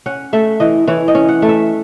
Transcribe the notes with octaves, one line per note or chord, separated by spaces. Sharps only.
C#4 F#5
A3 E5
E3 D#5
E3 C#5
D#5
C#4
F#5
A3
E5